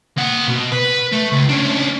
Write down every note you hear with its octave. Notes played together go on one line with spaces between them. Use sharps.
A#3 F#5
B2
B4
A3
C#2
C#4 D4